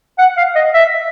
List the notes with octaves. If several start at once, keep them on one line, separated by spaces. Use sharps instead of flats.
F#5
F5
D#5
E5